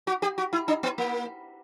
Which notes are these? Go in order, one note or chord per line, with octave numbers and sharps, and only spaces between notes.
F#4
G4
F#4
E4
D4
B3
A#3